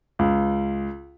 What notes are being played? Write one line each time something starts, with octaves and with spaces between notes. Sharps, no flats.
C#2